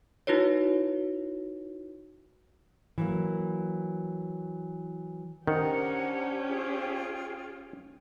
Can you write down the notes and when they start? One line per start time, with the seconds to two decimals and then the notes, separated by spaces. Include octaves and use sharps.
0.27 D#4 E4 F#4 B4 C#5
2.98 E3 F#3 A#3
5.47 D#3 C#4 D4 G4 C5 F#5 A#5
6.48 F4 G#4 G5